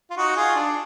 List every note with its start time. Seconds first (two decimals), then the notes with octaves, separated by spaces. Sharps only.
0.11 F4
0.17 D#4 F#4
0.36 F4 G#4
0.56 D4